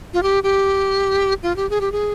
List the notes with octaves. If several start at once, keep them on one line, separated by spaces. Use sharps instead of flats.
F4
G4
G4
F4
G4
G#4
G4
G#4